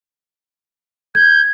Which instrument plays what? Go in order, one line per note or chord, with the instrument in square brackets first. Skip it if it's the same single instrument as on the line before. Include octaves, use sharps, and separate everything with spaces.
[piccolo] G6 [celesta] G#6